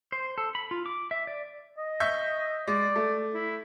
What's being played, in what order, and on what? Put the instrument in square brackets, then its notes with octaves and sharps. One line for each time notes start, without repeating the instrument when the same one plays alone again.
[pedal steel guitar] C5
A4
B5
F4
D6
E5
D5
[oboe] D#5
[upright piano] E5 C#6 G6
[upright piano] G#3 [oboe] D5
[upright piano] A3
[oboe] E4